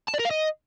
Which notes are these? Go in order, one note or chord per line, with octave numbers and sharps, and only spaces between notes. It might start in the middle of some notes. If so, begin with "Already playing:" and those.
A5
D5
A#4
F5
D#5